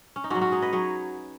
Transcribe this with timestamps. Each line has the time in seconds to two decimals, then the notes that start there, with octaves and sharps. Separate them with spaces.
0.16 C#4
0.24 D#4
0.30 G#2 F#3 C#4 F#4
0.41 C#4 F#4
0.52 D#4 G#4
0.62 B4 D#5
0.72 F#3 G#4 C#5